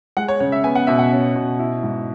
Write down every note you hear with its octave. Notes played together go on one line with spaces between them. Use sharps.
G#3 F#5
C#5
C#3 C#5
E5
B3 G#5
F#5
B2 E5
F#5
C#4
B2
E4
G#2